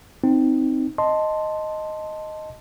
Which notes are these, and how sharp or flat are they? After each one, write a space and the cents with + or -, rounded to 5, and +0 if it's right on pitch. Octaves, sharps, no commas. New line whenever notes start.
C4 +0 D#4 +0
D#5 +0 A5 +0 C6 +0